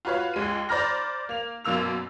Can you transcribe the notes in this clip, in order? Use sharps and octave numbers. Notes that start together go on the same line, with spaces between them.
F4 F#4 B4 C#5 F5
C#2 G#3 D#7
C5 D5 A#5 B5 F6 A#6
A#3 F7
F#2 B2 A#3 E6 F7